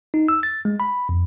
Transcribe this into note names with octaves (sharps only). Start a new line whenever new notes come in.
D#4
E6
A6
G#3
B5
F2